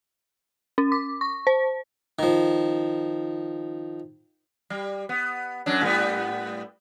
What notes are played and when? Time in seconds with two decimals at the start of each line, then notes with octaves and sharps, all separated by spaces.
0.78 C#4
0.92 D6
1.21 C#6
1.47 C5
2.19 D#3 F3
4.70 G3
5.09 B3
5.66 F#2 F#3 D4
5.81 A2 G3 B3